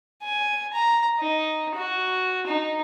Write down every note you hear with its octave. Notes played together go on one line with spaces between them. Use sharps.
G#5
A#5
D#4
F#4
D#4